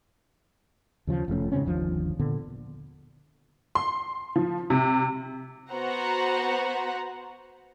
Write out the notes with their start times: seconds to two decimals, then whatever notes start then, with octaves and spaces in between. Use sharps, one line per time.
1.07 D#2 C#3 F3
1.28 F1 F3 A3 C#4
1.52 G#2 C#3 C4 C#4
1.65 G1 D#2 F3 D4
2.19 A#2 D3 B3
3.75 C6
4.36 F3
4.70 C3
5.70 B3 F#4 C5 F#5 A#5